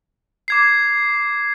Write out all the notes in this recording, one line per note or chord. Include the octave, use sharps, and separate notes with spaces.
D6 G#6 C7